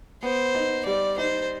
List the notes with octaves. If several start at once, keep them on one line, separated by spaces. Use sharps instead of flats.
B3 C5
D#4
G3 D5
D#4 C5